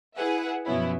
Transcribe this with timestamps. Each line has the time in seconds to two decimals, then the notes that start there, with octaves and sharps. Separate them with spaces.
0.16 E4 G#4 B4 E5 F#5
0.65 F#2 B2 F3 B3 C#4 E4